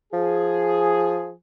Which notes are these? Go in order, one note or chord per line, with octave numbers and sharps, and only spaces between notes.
F3 G#4